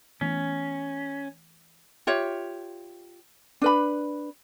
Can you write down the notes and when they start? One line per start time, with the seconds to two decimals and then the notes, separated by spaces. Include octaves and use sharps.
0.21 E3 A3 B3 C#4
2.07 F4 G4 C#5 E5
3.62 D4 B4 B5